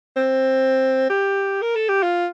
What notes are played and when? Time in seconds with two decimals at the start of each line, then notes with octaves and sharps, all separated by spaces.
0.17 C4
1.10 G4
1.62 A#4
1.75 A4
1.89 G4
2.03 F4